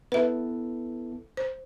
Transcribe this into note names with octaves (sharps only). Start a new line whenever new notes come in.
B3 E4 A4 B4 E5
C5